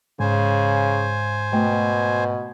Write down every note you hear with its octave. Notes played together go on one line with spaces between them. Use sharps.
G#2 C#3 C5 G#5
B2 A3